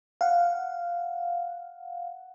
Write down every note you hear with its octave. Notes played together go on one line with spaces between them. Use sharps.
F5 F#5